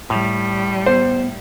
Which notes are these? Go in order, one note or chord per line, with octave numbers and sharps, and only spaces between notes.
A2 G3
B3 C5